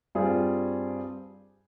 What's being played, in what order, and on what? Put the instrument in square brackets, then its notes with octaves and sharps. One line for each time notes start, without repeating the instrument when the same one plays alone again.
[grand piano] G2 G3 C4 F4 G#4